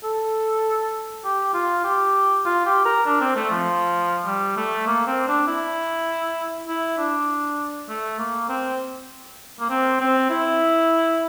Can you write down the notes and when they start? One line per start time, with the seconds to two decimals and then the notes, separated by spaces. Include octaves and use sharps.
0.04 A4
1.25 G4
1.54 F4
1.84 G4
2.45 F4
2.66 G4
2.86 A#4
3.06 D4
3.21 C4
3.36 A3
3.50 F3
4.26 G3
4.57 A3
4.87 A#3
5.07 C4
5.27 D4
5.47 E4
6.68 E4
6.98 D4
7.89 A3
8.19 A#3
8.49 C4
9.60 A#3
9.70 C4
10.01 C4
10.30 E4